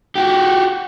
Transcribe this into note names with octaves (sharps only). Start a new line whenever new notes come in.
F#4 G4